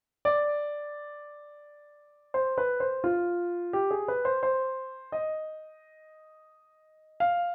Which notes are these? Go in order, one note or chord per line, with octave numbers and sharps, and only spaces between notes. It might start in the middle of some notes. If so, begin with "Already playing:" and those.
D5
C5
B4
C5
F4
G4
G#4
B4
C5
C5
D#5
F5